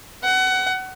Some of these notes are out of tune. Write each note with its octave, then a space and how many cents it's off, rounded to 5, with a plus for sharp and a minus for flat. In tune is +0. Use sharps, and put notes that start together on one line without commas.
F#5 +25